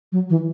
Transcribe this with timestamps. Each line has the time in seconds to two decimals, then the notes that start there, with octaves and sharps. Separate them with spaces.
0.12 F#3
0.30 E3